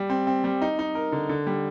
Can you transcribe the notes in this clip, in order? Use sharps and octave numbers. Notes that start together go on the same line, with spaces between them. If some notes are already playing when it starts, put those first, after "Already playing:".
Already playing: G3
C4
C4
G3
D#4
D#4
A#4
D3
D3
G3